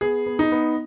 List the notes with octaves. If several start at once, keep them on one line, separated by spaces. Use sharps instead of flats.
B3 G#4
B3
D#4
B3